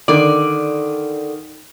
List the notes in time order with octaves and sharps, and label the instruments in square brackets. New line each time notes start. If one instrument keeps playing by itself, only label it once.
[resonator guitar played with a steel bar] D3 D5 [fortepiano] D#3